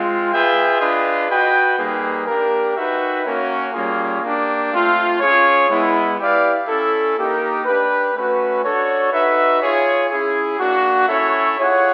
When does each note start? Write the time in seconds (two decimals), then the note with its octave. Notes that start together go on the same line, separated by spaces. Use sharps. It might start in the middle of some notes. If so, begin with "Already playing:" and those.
Already playing: G#3 C4 F4
0.31 F4 G#4 B4 E5 G5
0.79 D4 F4 G#4 B4 D#5
1.28 F#4 B4 D#5 G5
1.77 G3 A#3 D#4 G#4 B4
2.26 A#3 D4 G4 A#4
2.75 D#4 F#4 B4 E5 G5
3.24 A#3 C#4 F#4 A#4 C#5
3.73 G3 A#3 C#4 F4 G#4
4.22 A#3 D4 G4
4.71 A3 C4 F4
5.20 C#4 F4 G#4 C#5
5.69 G#3 B3 E4
6.18 E4 G4 B4 D5 F5
6.67 C#4 E4 A4
7.16 A#3 D#4 G4 A#4 D#5
7.65 D4 G4 B4
8.14 A3 C#4 F#4 B4
8.63 D4 F#4 A4 C#5
9.11 D#4 F#4 B4 E5
9.61 F4 G#4 C#5
10.10 C#4 E4 G#4
10.59 A#3 D4 F#4
11.07 C#4 E4 A4 C#5 E5
11.57 F4 G#4 C#5 F#5